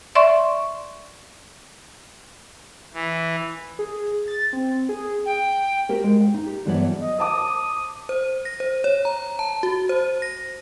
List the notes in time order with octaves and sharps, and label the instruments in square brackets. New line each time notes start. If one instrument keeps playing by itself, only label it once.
[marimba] D5 E5 C6 C#6
[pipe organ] E3
[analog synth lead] G#4
A6
C4
G#4
[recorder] G5
[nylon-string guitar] F#4 G4 A#4
G#3
G5
D#4
G4
E2 G2 E3 F#3 B3 D5
[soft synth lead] D#5
[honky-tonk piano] C5 A5 D6 [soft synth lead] D#6
[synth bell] C5
A#6
C5
C#5
A#5
A5
F#4
C5
A#6